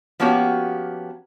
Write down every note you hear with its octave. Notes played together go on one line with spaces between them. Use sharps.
F3 A#3 B3 C#4 F#4 G4